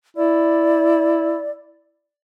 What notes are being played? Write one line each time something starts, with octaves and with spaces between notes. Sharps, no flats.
E4 D5